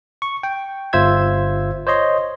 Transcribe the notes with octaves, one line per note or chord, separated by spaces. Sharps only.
C#6
G5
G1 F4 C5 E5 E6 G#6
C5 C#5 D#5 C6